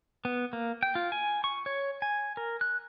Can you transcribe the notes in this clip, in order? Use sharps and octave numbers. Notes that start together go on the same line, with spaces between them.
B3
A#3
G5
F4
G#5
C#6
C#5
G#5
A#4
F#6